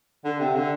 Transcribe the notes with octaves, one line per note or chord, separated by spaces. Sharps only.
D3
C3
D3